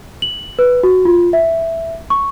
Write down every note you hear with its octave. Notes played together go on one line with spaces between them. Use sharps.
F#7
B4
F#4
F4
E5
C#6